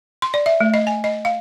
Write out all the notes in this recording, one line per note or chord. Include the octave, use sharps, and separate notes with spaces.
C6
D5
E5
A3
D#5
G#5
D#5
F5